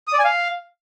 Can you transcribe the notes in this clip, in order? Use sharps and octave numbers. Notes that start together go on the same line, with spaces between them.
D#6
D5
G#5
F5